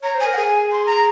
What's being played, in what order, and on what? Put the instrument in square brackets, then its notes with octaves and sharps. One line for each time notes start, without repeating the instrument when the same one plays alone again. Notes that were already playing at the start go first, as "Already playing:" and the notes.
[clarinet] C#5 [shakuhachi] A#5
[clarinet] C5
[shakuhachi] G#5
[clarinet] A#4
[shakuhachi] F#5
[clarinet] G#4 [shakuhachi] G#5
[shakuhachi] C6
A#5